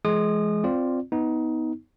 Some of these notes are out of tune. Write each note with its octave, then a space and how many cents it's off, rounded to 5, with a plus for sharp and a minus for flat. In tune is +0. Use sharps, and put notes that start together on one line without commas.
E3 +45 G#3 +20 D#6 -35
C4 -5 F4 +0 D5 +0
B3 +0 D#4 +20